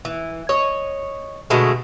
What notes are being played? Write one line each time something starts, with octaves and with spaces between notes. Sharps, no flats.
E3
C#5 D#5
B2 D3 G#3 A3